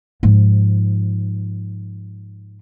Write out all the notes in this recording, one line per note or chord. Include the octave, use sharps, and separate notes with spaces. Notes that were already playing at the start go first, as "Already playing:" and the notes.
G#2 F3